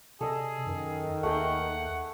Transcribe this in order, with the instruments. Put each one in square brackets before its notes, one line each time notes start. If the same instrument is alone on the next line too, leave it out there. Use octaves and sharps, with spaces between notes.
[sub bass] C3 [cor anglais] G#4 [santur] A4 D#5
[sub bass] F#2 [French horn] D#3
[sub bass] D#2 [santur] A3 G#4 G5 [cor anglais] F#5